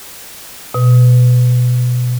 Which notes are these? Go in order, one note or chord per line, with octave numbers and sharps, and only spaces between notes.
B2